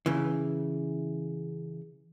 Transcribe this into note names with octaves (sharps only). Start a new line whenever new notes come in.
C#3 E3